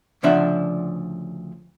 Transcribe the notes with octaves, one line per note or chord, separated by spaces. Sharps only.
D2 C#3 F3 D4 E5 F#5